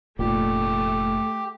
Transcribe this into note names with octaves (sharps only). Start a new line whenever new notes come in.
F1 A#2 A3 G4